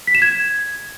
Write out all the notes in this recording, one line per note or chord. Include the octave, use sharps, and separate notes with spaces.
B6
E7
G#6